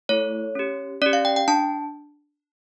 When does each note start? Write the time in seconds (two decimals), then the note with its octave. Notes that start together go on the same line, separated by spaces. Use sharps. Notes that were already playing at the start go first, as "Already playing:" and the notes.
0.09 A3 E4 A4 C#5
0.55 C#4 G4
1.02 C#4 G4 D5
1.13 F5
1.25 G5
1.36 G5
1.48 D4 A5